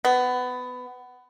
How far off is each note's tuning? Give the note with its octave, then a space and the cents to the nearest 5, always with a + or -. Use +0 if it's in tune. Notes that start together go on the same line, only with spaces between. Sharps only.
B3 +20